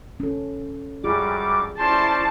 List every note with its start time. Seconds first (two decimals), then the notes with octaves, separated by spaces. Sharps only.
0.20 C#4 A4
1.04 F#2 G3 F4 G4 G#4 D6
1.79 C#4 E4 C5 D5 A5 C6